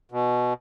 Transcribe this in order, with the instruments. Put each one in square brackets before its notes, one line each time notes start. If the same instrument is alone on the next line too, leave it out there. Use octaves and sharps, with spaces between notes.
[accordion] B2